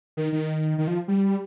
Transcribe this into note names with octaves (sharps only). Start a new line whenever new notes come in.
D#3
D#3
D#3
F3
G3